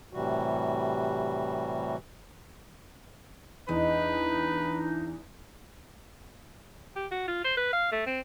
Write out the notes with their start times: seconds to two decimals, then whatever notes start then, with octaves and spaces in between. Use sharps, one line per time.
0.13 A2 C3 E3 G3 F#4
3.69 E2 G#3 D4 D#4 B4
6.96 G4
7.11 F#4
7.28 F4
7.44 C5
7.57 B4
7.73 F5
7.92 A3
8.07 C4